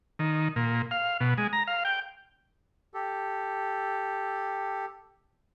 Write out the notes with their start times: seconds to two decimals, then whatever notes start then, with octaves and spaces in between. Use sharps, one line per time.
0.19 D#3
0.56 A#2
0.91 F5
1.20 B2
1.38 G#3
1.53 A#5
1.67 F5
1.85 G5
2.94 G4 A4